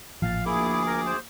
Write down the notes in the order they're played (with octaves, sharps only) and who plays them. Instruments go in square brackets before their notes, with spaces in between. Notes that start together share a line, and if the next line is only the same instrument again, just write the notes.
[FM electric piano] A1 A#2 A6 [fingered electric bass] F3 [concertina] F5
[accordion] D2 G#4 D6 [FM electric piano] A#3 [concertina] E4
[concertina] A#4
C5